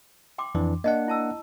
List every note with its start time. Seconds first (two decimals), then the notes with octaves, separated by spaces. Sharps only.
0.38 G5 C6 D6
0.55 F2 E3 D4
0.84 A#3 D4 D#5 F#5
1.08 E4 A5 E6